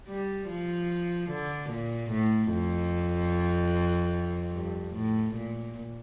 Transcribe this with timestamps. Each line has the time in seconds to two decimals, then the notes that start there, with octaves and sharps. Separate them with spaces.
0.09 G3
0.48 F3
1.30 D3
1.70 A#2
2.11 A2
2.51 F2
4.53 G2
4.94 A2
5.35 A#2